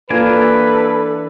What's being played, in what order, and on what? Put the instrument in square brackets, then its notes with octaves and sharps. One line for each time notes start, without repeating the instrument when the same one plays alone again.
[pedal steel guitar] E3 D4 G#5 [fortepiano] A#3 F4 [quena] A4 [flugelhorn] B4